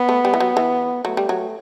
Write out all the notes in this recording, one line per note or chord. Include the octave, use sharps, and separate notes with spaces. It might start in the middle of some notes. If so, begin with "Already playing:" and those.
Already playing: B3
A3
G3
E3
F#3
E3
F#3 A3
G3
F#3